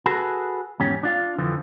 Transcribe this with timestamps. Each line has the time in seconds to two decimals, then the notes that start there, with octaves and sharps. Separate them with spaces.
0.06 F#4 G#4 A4 B4
0.80 E2 G#2 C#4 G4
1.03 D4 F4 F5
1.38 F2 D3 E3 F3